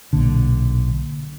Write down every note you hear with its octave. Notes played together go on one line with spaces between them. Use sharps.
B1 A#2 D3